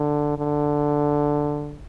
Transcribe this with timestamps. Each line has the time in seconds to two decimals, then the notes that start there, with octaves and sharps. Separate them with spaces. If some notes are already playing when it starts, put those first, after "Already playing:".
Already playing: D3
0.38 D3